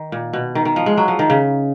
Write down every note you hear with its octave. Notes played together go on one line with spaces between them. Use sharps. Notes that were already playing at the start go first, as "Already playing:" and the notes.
Already playing: D#3
A#2
B2
D#3
D#3
F3
G#3
F#3
F3
D#3
C#3